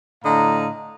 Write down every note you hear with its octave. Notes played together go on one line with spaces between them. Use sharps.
A2 D3 D#5 F5 A#5